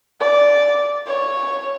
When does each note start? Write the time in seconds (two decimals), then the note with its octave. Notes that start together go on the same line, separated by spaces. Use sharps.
0.20 D5
1.07 C#5